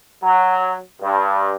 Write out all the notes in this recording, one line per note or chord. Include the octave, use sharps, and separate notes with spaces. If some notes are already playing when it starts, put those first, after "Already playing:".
F#3
G2